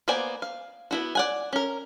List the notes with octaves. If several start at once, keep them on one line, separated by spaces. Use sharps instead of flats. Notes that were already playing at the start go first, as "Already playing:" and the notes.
A#3 B3 C5 D5 G#5
F5
B3 E4 F#4
D5 F#5 G#5
C#4 A#4